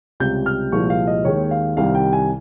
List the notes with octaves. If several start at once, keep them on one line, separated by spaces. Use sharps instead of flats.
C#2 C3 G3 G6
F6
C2 A#2 F3 G#3 C#6
F5
D#5
D#2 D#3 G#3 C#5
F5
C2 C3 D#3 G3 F5
G5
G#5